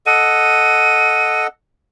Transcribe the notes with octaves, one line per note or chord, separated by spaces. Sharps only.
A4 D#5 F#5 D#7